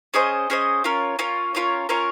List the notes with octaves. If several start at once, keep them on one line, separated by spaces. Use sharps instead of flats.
C#4 G#4 C5 D#5
C#4 G#4 C5 D#5
C#4 F4 A#4 C#5
C#4 F4 A#4 C#5
C#4 F4 A#4 C#5
C#4 F4 A#4 C#5